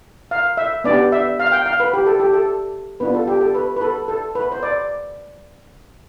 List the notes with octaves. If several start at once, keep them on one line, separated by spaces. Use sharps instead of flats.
F5
E5
B3 D4 G4 D5
E5
F5
G5
F5
B4
G4
A4
G4
A4
B3 D4 F4 B4
A4
G4
A4
B4
B4
A4
A4
B4
C5
D5